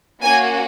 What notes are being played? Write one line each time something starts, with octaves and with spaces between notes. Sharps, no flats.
A#3 C#4 F#4 G#5